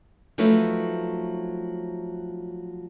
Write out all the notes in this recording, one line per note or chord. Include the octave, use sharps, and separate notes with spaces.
F3 F#3 A3 D#4 B4